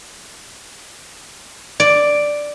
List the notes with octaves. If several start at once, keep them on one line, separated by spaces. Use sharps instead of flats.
D5